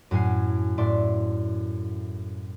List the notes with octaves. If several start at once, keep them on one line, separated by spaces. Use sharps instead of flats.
F#2 A2 G#5 C7
A2 D5 E5 C6